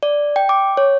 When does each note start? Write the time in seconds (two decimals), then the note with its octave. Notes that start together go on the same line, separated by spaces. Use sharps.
0.03 D5
0.36 G5
0.49 D6
0.77 C#5